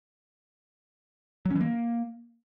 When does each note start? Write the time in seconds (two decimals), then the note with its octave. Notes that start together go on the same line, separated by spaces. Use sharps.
1.45 F#3
1.51 C#4
1.56 E3
1.61 A#3